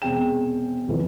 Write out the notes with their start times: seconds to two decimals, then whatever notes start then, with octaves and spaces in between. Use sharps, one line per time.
0.02 E1 C3 G#4 G5 E7
0.88 D#1 F2 E3 F3